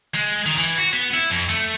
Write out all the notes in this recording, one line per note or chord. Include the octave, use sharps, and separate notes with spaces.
G#3
D#3
E3
F#4
B3
E4
F2
A3